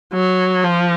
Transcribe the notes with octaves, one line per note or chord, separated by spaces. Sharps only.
F#3
F3